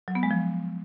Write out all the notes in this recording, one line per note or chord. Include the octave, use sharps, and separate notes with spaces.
F#3
B3
G#3
F3